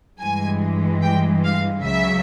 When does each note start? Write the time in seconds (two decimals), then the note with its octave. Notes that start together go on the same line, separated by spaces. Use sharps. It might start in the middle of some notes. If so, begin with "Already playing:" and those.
0.20 G2 E3 G#3 G#5
1.02 G5
1.44 F5
1.84 C#2 C#3 F#3 E5